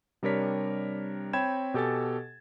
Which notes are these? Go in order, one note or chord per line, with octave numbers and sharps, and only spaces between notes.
C3 G3 D4 A#4 C#5 B6
C4 C#5 G5 B5 G#6 E7
B2 G4 A4 G#5 A6